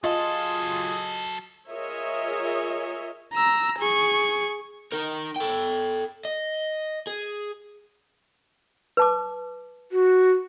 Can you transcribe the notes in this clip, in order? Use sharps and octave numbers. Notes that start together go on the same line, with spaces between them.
F#3 F4 G#4 A4 D#5
F4 G#4 A#4 C#5 D#5 E5
A#5 E6
G#4 C#6
D#4 A#4
A4 G5
D#5
G#4
B4 A5 D6
F#4